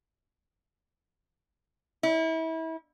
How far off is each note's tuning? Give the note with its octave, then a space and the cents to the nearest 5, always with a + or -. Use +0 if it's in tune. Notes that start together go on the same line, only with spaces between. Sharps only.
E4 -30